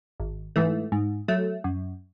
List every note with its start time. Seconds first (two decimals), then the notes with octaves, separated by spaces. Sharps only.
0.20 G#1
0.56 G#2 E3 A3
0.92 G#2
1.28 F#3 A3
1.64 F#2